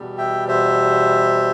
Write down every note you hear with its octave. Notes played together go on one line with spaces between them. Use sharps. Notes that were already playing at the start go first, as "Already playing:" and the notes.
Already playing: E2 B2 G3
E5 G5
C5 E5